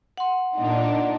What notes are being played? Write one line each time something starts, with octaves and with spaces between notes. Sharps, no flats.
F#5 C6
A#2 D4 D#4